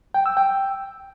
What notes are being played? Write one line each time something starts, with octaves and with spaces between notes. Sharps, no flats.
G5
E6
G5